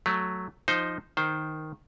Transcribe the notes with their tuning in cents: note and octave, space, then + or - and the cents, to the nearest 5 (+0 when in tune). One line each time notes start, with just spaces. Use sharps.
F#3 +0 A3 +0
F3 +0 D#4 +0 C5 -5
D#3 +0 C5 +0